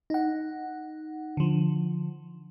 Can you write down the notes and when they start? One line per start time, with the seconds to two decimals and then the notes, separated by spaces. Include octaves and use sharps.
0.10 D#4 F#5
1.37 D3 F3